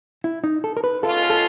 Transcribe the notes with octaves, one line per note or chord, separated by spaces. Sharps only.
E4
D#4
A4
A#4
B4
B2 G#3 C#4 F4 A4
A4